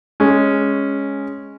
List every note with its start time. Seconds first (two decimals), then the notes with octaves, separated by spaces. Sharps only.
0.20 G#3 C#4